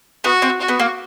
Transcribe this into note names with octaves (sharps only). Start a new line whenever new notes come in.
B3 F#4
C4
F#4
B3
A#3